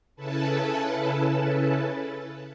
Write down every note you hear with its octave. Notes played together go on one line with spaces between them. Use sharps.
C#3 C#4 E4 A4 B4 A5